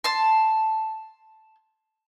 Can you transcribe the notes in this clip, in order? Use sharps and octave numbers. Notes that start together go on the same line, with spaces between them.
A5 C6